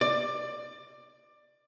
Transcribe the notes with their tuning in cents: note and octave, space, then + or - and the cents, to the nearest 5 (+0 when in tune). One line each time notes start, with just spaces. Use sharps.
D5 +20